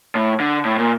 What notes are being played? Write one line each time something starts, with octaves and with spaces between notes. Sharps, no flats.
A2
D3
A2
A#2